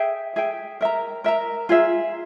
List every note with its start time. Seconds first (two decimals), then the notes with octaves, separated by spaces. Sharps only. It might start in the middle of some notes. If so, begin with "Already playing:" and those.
Already playing: G#4 E5 G5
0.36 G#4 E5 G5
0.81 A#4 E5 A#5
1.24 A#4 E5 A#5
1.69 F4 G#4 E5